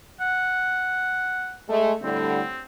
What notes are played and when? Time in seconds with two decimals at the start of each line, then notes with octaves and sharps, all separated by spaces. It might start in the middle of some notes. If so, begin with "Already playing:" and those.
0.20 F#5
1.68 G#3 A3
2.02 A2 D3 G3 C4